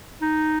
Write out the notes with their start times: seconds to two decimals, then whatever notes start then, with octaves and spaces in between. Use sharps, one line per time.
0.22 D#4